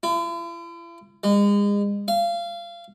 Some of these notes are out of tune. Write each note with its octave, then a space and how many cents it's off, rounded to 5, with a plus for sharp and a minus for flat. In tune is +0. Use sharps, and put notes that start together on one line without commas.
E4 +45
G#3 -35
F5 -25